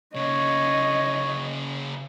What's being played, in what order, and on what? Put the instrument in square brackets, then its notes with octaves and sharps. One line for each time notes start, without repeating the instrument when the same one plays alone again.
[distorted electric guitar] C#3 A#3 [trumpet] C#5 [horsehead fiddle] D#5